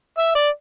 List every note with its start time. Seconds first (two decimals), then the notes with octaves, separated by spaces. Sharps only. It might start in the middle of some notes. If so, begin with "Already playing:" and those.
0.18 E5
0.35 D5